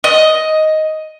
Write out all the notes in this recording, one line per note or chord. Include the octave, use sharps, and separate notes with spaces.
D#5